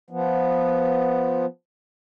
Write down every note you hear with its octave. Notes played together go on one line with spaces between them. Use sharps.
F3 B3